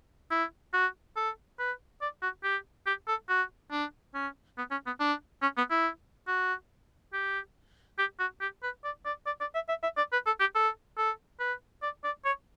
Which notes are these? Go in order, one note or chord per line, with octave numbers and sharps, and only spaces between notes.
E4
F#4
A4
B4
D5
F#4
G4
G4
A4
F#4
D4
C#4
B3
C#4
B3
D4
C#4
B3
E4
F#4
G4
G4
F#4
G4
B4
D5
D5
D5
D5
E5
E5
E5
D5
B4
A4
G4
A4
A4
B4
D5
D5
C#5